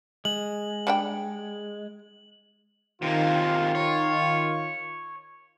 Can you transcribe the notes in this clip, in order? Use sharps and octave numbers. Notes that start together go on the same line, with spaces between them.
G#3 F#7
G3 D4 G5
C3 D#3 A#3 F4
C#5